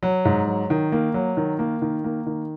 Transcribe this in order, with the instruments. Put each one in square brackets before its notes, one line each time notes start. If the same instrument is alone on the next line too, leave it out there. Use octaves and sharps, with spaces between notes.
[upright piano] F#3
G#2
F#3
D#3
A#3
F#3
D#3
A#3
D#3
A#3
D#3